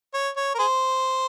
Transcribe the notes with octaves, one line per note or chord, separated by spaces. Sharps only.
C#5
C#5
A#4
G#4 C5